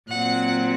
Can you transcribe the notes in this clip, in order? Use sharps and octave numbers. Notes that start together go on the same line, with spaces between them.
A#2 F#3 C4 F#5